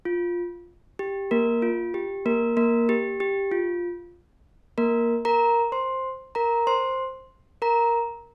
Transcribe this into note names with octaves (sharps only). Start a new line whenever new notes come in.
F4
G4
A#3 A#4
F4
G4
A#3 A#4
A#3 A#4
G4
G4
F4
A#3 A#4
A#4 A#5
C5 C6
A#4 A#5
C5 C6
A#4 A#5